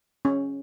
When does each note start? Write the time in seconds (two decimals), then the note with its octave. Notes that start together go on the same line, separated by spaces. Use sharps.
0.25 C#4